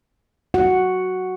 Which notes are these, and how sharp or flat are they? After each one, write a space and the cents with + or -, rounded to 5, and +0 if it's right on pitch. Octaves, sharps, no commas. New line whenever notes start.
F#4 +0 F#5 +0